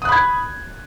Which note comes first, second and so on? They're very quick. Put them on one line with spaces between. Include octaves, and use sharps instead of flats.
D#6 F#6 B5 G#6